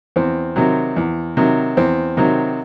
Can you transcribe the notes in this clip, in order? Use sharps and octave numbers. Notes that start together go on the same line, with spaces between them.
E2 C4
C3 D#3 F#3
E2
C3 D#3 F#3
E2 C4
C3 D#3 F#3